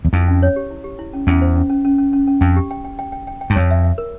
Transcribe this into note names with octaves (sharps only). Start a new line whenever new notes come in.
E2
F2 E4
C#4
C#5
G4
E4
G4
E4
C#4
E2 C#4
C5
C#4
C#4
C#4
C#4
C#4
C#4
F2 G5
G4
G5
G5
G5
G5
G5
G5
G2
F2 C#5
E5
E5
A#4